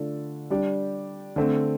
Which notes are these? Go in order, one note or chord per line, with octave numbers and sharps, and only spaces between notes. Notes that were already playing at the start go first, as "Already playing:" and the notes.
Already playing: D3 A3 D4 F4 A4
G3 D4 G4
D3 A3 C4